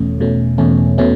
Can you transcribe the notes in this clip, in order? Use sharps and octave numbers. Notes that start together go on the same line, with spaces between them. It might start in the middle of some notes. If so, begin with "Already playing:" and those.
Already playing: E2 B2 A3 C#4
E2 B2 A3 C#4
E2 B2 A3 C#4
B2 A3 C#4